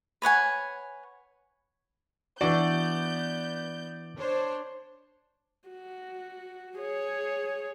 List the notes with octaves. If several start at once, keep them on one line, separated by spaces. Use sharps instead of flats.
B4 C#5 F#5 G#5
E3 B3 D4 F#4 D5 G6
D4 C5 C#5
F#4
G#4 C#5